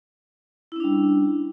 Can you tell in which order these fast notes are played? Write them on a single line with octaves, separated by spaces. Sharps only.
E4 C#4 D4 G3